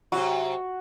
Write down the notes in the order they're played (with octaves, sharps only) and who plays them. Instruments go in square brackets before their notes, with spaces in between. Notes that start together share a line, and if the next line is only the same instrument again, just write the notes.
[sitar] C3 F#3 [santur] F#4